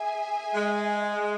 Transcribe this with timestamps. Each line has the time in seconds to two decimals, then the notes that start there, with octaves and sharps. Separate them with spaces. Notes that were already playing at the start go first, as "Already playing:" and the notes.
Already playing: G#4 E5 G#5
0.54 G#3